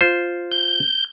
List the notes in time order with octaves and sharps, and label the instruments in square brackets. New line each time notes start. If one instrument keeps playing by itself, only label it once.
[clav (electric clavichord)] F4 C5
[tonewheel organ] G6